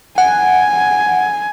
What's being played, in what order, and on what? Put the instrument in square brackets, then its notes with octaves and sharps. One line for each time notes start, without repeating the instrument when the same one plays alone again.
[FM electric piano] F#5 [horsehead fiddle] G#5